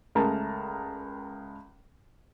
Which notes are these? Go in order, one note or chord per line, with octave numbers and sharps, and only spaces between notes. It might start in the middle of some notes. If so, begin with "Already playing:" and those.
C#2 A3 G#4 A#4 A5 A#5